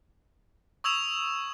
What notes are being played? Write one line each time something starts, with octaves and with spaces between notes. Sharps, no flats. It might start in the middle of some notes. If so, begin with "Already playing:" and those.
C#6 D#6 E6 G#6 E7 F7